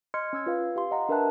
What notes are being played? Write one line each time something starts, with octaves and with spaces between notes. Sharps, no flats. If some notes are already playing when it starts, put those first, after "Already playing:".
D#5 C6 F6 G#6 C#7
C#4 E6 G#6
F4 B4 F5
G4 F5 C6
D#5 F#5 A#5
D4 A#4 B4 E5 A5 F#6